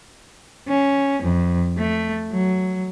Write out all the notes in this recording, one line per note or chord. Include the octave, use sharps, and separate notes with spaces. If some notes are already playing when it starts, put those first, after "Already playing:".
C#4
F2
A3
F#3